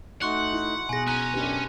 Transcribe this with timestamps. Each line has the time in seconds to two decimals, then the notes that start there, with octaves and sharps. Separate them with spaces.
0.22 A3 D#4 F#4 F#5 C6 C#6 F#6
0.53 E4
0.89 B2 G#4 G#5 A#6
1.08 C#4 G#5 A#5 F#6
1.34 F#2 D4 G4 B4